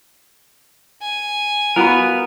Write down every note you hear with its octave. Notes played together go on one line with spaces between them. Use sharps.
G#5
B3 F4 F#4 A#4 B5